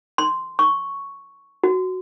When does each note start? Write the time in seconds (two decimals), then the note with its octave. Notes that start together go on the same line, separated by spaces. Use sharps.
0.18 C6
0.59 C#6
1.64 F#4